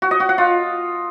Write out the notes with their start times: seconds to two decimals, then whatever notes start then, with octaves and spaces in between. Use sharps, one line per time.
0.02 F#4
0.11 D#5
0.20 F#4
0.29 F#5
0.38 F4